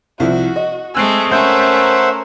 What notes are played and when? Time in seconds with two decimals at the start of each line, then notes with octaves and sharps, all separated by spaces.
0.20 C2 F3 E4 F#4
0.56 D#5
0.95 G#3 A3 C4 G#5 E6 F#6 C7
1.31 A3 C#4 A#4 C5 E5 F#5 G6